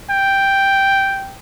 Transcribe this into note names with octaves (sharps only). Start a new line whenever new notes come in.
G5